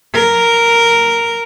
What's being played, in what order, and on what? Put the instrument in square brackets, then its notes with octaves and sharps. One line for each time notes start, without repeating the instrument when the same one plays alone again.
[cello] A#4